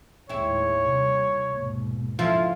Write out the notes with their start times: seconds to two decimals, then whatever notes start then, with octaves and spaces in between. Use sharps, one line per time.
0.29 D#2 A2 G#3 C4 E4 C#5
0.88 C3 G3
1.45 D#2 G#2 B2
2.19 C#3 F3 E4 F4 E5